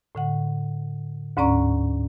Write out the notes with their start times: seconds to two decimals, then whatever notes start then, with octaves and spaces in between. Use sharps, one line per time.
0.15 A2 D3 F#5
1.37 D2 G#2 C#4 D5 A#5 C#6